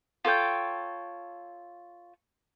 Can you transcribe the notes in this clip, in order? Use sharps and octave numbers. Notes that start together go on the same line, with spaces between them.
F4 A4 C#5 G5